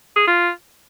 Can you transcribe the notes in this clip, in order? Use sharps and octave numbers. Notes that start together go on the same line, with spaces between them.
G#4
F4